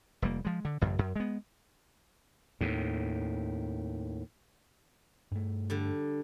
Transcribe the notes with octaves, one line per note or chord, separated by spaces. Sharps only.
F1 G3 A#3
F3 G#3
D3
A1 F#2 C#3
F#2
G#3 B3
D#2 A2
G2 A3
D3 G3